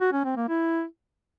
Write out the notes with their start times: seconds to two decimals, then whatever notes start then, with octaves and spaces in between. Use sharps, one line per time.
0.01 F#4
0.13 C#4
0.24 C4
0.36 A#3
0.48 E4